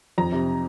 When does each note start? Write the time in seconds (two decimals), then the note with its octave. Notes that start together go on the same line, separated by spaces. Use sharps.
0.18 F2 A#5
0.32 C3